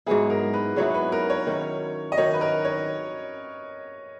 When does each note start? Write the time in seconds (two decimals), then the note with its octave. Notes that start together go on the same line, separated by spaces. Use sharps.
0.06 G#2 F#3 B3 E4 G#4
0.30 A#4
0.54 B4
0.76 G#2 F#3 B3 E4 C#5
0.95 B4
1.12 A#4
1.30 C#5
1.47 D#3 F#3 C#4 E4
2.12 D#5
2.17 D#3 F#3 C#4 E4 C#5
2.34 B4
2.41 A#4
2.65 C#5